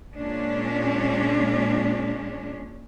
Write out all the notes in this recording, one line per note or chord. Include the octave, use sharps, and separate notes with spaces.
A#2 G#3 C#4 D4